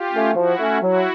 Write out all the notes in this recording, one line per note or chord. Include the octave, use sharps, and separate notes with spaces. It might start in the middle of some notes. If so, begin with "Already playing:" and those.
Already playing: F4 G4
A3 C#4
F3 E4 F#4
A3 C#4
F#3 E4 F#4